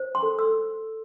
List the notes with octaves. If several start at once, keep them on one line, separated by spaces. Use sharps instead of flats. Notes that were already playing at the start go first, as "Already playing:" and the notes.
Already playing: C5
C6
A4
E6